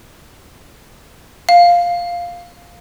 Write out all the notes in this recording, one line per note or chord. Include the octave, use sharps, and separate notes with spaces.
F5